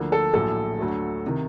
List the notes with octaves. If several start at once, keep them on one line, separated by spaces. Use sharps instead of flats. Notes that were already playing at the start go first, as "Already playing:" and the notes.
Already playing: D2 D3 F3 A#3
A4
A#1 A2 F#3 A4
D2 D3 F#3 A3
C3 D#3